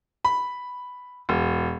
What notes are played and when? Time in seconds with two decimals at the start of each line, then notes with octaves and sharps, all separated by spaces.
0.25 B5
1.29 E1